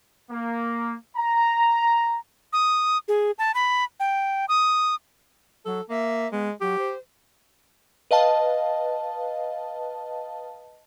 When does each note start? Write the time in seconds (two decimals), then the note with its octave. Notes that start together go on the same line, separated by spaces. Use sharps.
0.31 A#3
1.17 A#5
2.53 D#6
3.08 G#4
3.38 A5
3.54 B5
4.00 G5
4.49 D#6
5.66 F#3 A4
5.90 A#3 E5
6.32 G#3 B3
6.61 F#3 G4
6.79 C5
8.11 B4 D#5 F5 A5